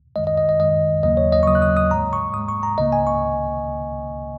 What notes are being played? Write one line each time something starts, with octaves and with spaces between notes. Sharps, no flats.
F#2 D#3 G#3 D#5
D#5
D#5
D#5
F#2 D#3 G#3 D#5
D#2 C#3 F#3 A#3 D#5
C#5
D#5
C#6
D#2 C#3 F#3 A#3 D#6
F#6
D#6
D#6
G#2 G#3 A#5
C#6
G#2 G#3 D#6
C#6
A#5
C#2 C#3 A#3 D#5
G#5
C#6